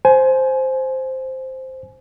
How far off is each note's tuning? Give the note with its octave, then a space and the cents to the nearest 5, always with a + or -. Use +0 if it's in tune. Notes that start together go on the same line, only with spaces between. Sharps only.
C5 +0 G#5 +25